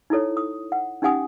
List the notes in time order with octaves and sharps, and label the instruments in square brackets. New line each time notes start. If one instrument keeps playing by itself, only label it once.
[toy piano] D#4 E4 A4 C#5
D#6
F#5
C#4 D#4 G4 F#5 G#5 D#6